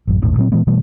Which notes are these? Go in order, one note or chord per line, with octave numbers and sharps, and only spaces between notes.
A1 F#2
G#1 D#2 A2 D#3
A#2 F#3 C4
A#2 E3 G#3 B3
B2 E3 G3 A3